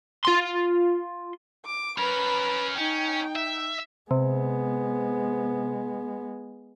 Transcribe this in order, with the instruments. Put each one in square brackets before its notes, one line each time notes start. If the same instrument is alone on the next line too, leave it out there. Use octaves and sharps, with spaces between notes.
[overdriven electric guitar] F4 C6
[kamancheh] D6
[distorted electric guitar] C#4 A#4 [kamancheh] B4 B5
[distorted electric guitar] C#4 [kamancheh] D#4 G5
[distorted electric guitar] E5
[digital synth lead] C3 [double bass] G#3 B3